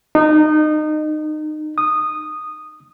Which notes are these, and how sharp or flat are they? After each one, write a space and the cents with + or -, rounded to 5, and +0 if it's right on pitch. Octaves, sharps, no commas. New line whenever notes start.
D#4 -25
D#6 -10